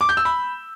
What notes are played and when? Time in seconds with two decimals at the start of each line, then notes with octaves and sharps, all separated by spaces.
0.01 D6
0.09 G6
0.17 E6
0.25 B5